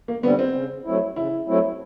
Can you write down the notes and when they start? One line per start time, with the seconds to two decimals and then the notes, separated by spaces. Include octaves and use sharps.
0.08 A#3
0.23 D3 G3 B3 C4
0.39 C4
0.54 C#3
0.85 F#3 A3 C4 E4
1.16 C#3 E4
1.48 F#3 A3 C4 E4